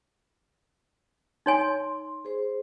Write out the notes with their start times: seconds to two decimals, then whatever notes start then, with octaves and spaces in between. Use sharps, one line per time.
1.46 D#4 C#5 G#5 C6
2.25 G#4 C5